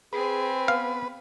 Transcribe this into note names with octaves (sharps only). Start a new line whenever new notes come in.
C4 G#4 B4 G#5
B3 F5